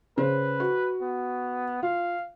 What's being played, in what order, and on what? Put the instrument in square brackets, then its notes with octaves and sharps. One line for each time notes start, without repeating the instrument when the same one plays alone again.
[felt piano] C#3 C5 [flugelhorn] B4
[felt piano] F#4
[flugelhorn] B3
[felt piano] F4 [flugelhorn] F5